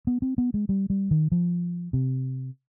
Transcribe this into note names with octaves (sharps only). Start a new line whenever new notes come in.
B3
C4
B3
G#3
G3
G3
D#3
F3
C3